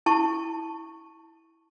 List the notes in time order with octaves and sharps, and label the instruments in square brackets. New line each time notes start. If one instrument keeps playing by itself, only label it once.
[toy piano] E4 A5 C#6